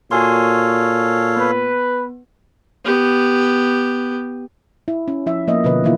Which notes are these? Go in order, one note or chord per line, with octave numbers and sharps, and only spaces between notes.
A#2 F#4 A4 C#5 F5 G#5 C6
B3 B4
B3 G4
E4
C#4
F3 E4 E5
F3 A#3 B3 D#5 E5
B2 D3 F3 B3 B4 D#5
E3 A#3 E4 F4